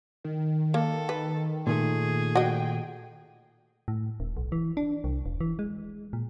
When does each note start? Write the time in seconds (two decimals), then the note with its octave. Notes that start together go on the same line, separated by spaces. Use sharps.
0.24 D#3
0.74 A#3 A4
1.09 B4
1.67 A#2 D#3 A3 G#4
2.35 F#4 D#5 G5
3.88 A2
4.20 D#1
4.37 B1
4.52 E3
4.77 D4
5.04 C2
5.26 E1
5.41 E3
5.59 G#3
6.13 A#2